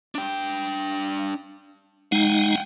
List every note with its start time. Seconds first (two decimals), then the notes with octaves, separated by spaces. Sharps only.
0.15 D4 G5
2.12 G#3 D#4 F#5 G5